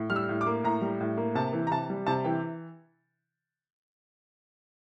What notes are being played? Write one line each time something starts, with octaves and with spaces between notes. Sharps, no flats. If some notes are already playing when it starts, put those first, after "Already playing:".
Already playing: A2
G3 F6
E6
A2
D6
A#3
A2 A#5
G3
A2
A#3
C3 A5
E3
A#5
C3 A5
G3
C3 A5
E3 G5